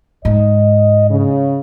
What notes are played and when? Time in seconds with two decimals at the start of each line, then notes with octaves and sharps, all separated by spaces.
0.25 G#2 D#5
1.10 C#3